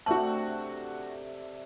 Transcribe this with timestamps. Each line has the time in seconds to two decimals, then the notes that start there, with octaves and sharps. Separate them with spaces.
0.06 C3 A3 D4 F#4 A5 F#7